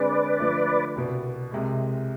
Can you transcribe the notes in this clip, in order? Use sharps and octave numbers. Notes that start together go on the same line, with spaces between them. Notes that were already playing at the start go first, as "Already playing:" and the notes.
Already playing: D3 G#3 C4 G#4 B4 D5
D3 F3 A3
C2 B2 B3
C2 C3 G#3